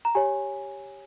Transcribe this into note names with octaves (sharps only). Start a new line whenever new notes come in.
A#5
G4 C#5 G#5